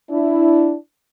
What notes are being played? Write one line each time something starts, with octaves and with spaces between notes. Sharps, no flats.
D4 E4